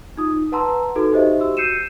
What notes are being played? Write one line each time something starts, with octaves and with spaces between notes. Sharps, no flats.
D#4 F4 D#6
B4 F#5 A5 A#5 C6 E6
D#4 F#4 A4 B4
D#4 G4 C5 D#5 E5
F#4 G4 E6
E6 G6 C7 C#7 D#7 E7